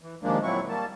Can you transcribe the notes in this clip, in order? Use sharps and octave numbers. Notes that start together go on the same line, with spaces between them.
E3
D#2 F3 G#3 A#3 D4
A#2 F#3 C4 E4 C#6
G3 A#3 A5